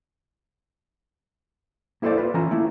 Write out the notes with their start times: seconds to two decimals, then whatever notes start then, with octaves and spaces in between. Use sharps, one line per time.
2.02 A#3 E4 A4 B4 C5 D5
2.18 F4 B4
2.34 E3 C#4 F4 A#5
2.51 A3 A#3 E4